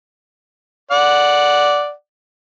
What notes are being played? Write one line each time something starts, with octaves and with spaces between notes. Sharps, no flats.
D5 F#5